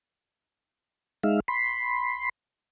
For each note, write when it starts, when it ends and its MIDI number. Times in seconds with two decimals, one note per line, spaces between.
1.24 1.40 56
1.24 1.40 63
1.24 1.40 76
1.24 1.40 77
1.48 2.29 83
1.48 2.29 84